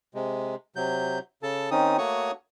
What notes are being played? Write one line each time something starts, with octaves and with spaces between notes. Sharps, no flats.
C3 G#3
C3 F#3 G6
C#3 A4 A5
D#3 C4 C#4 D#4 D#6
A3 A#3 F#4 C#5 C#6 D#6